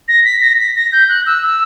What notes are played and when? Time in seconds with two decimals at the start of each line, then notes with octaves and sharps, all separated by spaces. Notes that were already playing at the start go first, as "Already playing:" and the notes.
0.08 A#6
0.25 B6
0.41 A#6
0.59 B6
0.76 A#6
0.92 G6
1.09 F#6
1.26 E6
1.44 E6